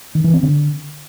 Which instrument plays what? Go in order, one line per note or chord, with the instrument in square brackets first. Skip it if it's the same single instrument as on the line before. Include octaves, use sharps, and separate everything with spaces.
[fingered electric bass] D#3
E3
C4
D3